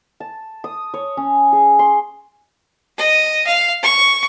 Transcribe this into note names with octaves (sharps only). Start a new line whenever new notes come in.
A5
D#6
C#5
C#4
G#4
C6
D#5
F5
C#6